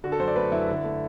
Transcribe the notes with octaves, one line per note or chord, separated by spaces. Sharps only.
D3 F#4
A4
F#2 C5
D5
A3 B4
F#2 E4
D3
A3